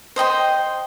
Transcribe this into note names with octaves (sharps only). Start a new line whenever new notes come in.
C5 D#5 G5 C6